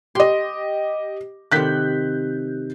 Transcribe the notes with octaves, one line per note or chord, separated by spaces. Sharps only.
G4 D#5 C6
C3 D#3 F#6 G6 B6